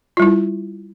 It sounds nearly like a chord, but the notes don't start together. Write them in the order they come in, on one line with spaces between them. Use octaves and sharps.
F4 G3 E4